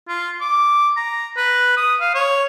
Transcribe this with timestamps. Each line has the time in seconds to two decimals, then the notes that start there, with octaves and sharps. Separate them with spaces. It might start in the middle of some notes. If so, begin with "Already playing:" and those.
0.09 F4
0.41 D6
0.97 A#5
1.37 B4
1.77 D#6
2.00 F5
2.15 C#5